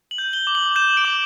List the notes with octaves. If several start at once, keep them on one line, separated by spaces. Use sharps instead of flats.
F#7
G6
G7
D6
F#7
G6 E7
D7
D6